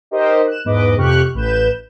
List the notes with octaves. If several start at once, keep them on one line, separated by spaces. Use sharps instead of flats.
D#4 G4 A#4 C5 D#5
F#6 E7
E2 G#2 B4 D#5 D6
F2 C3 G4 C#6 F6 F#6
A1 B4 G6 E7